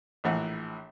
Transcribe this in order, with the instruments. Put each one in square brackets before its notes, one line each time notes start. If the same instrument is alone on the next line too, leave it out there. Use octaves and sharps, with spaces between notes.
[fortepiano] A#1 A2 E3 F#5